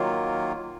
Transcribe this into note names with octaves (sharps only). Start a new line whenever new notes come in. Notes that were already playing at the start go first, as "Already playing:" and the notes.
Already playing: D#3 F#3 A#3 F4